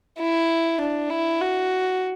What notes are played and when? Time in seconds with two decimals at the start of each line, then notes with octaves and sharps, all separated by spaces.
0.19 E4
0.80 D4
1.10 E4
1.41 F#4